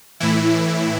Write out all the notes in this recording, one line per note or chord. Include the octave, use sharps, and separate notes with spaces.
A2 E3 E4